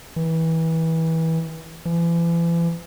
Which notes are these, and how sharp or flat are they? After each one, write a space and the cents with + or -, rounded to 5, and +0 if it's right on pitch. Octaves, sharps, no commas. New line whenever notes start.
E3 -25
E3 +40